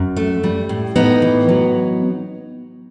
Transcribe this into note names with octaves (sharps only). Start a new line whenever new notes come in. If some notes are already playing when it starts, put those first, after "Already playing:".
Already playing: F#2
A3
G3
A2
A2 B3 D#4
E3
F#3